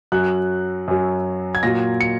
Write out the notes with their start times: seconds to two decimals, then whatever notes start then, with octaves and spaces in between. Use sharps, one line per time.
0.12 F#2 F#3 F#6
0.88 F#2 F#3
1.55 G#6
1.63 A#2 F#3 A#6
2.01 C#7